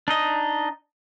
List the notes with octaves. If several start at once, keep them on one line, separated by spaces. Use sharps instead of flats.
D4 D#4 D#5